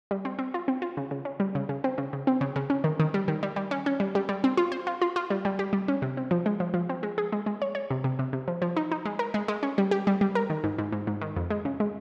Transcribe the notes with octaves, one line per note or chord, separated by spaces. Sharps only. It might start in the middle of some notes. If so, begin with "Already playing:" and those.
G3
C4
C4
F4
C4
F4
C#3
C#3
C#4
G3
C#3
C#3
C4
C#3
C#3
C4
C#3
C#3
C#4
D#3
D#3
G3
D#3
G3
G3
C#4
C#4
G3
G3
G3
C4
F4
C5
F4
F4
F4
G3
G3
G4
G3
C#4
C3
C4
F3
G#3
F3
F3
C4
G#3
G#4
G#3
G#3
C#5
C#5
C3
C3
C3
C3
F3
F3
D#4
D#4
G#3
A#4
G#3
G#3
C#4
G3
G4
G3
G3
A#4
D#3
G#2
G#2
G#2
G#2
D#3
F2
G#3
C#3
G#3